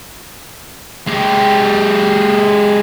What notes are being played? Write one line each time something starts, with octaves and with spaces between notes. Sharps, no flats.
G#3 G4